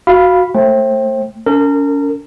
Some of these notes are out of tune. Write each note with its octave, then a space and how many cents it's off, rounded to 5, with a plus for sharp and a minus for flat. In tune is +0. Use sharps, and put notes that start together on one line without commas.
F#4 -5 F5 +0 B5 +0
A3 +20 C5 +35 G5 -5
C#4 +35 A#4 -30